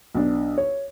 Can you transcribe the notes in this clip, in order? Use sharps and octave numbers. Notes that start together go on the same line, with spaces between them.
B1 D4
C#5